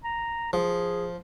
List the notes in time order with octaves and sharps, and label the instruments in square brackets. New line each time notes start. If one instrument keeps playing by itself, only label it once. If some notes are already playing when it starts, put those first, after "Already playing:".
[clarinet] A#5
[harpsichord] F3 [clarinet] G#4